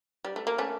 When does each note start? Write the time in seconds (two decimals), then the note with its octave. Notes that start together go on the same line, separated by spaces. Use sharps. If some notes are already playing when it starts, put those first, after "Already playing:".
0.25 G3
0.36 A3
0.47 A#3
0.58 A3 C#4